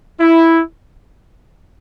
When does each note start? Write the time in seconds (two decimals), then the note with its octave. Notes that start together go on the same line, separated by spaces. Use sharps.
0.21 E4